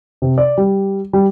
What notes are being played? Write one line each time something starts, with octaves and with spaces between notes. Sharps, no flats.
C3
D5
G3
G3